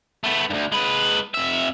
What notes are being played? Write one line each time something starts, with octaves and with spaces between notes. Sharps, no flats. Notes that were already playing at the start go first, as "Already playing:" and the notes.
A3 B3
D2 G2
G#3 B4
F2 E5